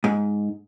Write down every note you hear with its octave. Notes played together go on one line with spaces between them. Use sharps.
G#2